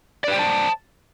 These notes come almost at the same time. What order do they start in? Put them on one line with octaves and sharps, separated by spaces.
D5 B4 G5 C5 A5